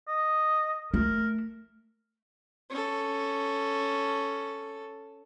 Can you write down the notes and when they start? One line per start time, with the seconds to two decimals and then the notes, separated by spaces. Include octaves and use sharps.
0.08 D#5
0.94 A3 A#4
2.70 C#4 A4